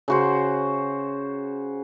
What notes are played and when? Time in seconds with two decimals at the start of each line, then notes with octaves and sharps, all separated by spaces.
0.08 C#3 F#4 C5